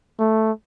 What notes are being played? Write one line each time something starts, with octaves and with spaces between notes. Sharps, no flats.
A3